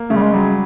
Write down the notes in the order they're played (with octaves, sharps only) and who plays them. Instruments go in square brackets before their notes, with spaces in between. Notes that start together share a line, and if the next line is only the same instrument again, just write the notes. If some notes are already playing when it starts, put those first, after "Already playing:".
Already playing: [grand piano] A#3
[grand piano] C#3 [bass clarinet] A3
[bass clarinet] G3
G#3
[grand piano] F#3 [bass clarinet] G3